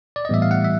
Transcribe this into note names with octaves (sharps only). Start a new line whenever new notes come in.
D5
D#5
A2 E3 G3 B3 E5
F5
F#5
E5